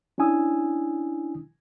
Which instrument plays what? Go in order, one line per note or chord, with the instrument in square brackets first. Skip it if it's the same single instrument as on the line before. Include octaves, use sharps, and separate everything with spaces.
[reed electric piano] C#4 D4 E4 G#5 D#6 E6